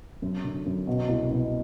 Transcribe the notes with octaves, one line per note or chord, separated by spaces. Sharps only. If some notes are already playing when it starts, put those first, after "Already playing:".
F#2
D3
F#2
B2
C2
B2